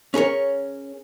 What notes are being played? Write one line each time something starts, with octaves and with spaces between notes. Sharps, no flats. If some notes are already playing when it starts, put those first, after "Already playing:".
C#4 G#4 A#4 C#5